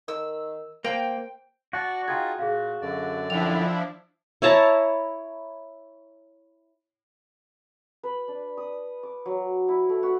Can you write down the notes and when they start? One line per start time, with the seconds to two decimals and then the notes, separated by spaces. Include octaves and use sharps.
0.08 D#3 E6
0.84 A#3 C5 G5
1.73 F#4 D5 F#5 A5 C#6
2.08 D#4 F4 G#4 G5 G#6
2.39 A#2 G#4 F5
2.82 F#2 D3 D5
3.30 F3 D4 E4 G5 F7
4.42 E4 C#5 A5 A#5
8.03 B4
8.28 D4
8.57 D#6
9.03 D6
9.26 F#3
9.68 E4
9.89 A3
10.03 F#4